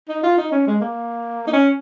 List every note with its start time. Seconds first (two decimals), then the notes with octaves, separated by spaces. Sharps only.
0.09 D#4
0.23 F4
0.38 D#4
0.52 C#4
0.67 G#3
0.81 A#3
1.47 D#4
1.53 C#4